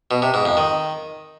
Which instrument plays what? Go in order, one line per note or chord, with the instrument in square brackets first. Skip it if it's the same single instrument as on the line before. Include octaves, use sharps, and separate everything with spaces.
[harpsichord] B2
C3
G#2
F2
D#3